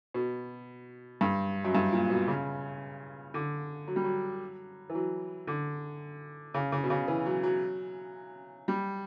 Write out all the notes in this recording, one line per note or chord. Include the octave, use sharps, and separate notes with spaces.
B2
G2
F#2
G2
A#2
B2
C#3
D3
F#3
G3
F#3
E3
F#3
D3
C#3
C#3
B2
C#3
E3
F#3
F#3
G3